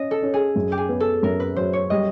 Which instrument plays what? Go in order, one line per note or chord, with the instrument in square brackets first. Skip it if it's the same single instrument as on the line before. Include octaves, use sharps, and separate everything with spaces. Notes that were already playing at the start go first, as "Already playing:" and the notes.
Already playing: [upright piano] C#4 [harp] D#5
[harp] A4
[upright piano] C#4
[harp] G#4
[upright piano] F#2
[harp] G4
G#4
[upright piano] B3
[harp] A4
[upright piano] F#2 [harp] A#4
[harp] B4
[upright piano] F#3 [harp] C5
[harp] C#5
[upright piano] G3 [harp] D#5